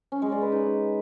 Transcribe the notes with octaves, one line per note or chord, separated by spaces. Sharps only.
C#4
G#3
D5
B4
D#4